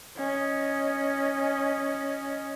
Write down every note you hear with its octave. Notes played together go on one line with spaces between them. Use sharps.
C#4 D#5